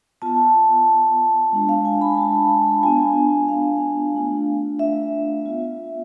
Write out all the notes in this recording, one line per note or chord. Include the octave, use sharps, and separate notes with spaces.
B3 F4 A5
G#3 D4 F4
F5
G#5
B5
A5
B3 D4 F4 G#5
F5
A3 D4 F4
E5
B3 F4